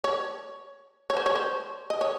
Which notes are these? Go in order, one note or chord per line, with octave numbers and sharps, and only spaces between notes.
C#5
C#5
C5
C#5
C5
D#5
C#5